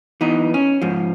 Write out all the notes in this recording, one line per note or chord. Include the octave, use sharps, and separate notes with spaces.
E3 B3 D#4
C#4
G#2 F3